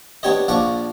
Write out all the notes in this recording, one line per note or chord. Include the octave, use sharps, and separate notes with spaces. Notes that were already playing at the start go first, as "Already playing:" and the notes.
B3 D4 G4 C#5 D#5
A#1 F3 D4 F#5 C#6 D6